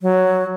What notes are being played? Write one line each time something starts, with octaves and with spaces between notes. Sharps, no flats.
F#3